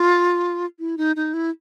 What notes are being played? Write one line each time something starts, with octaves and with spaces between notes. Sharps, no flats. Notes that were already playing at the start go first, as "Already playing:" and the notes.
Already playing: F4
E4
D#4
D#4
E4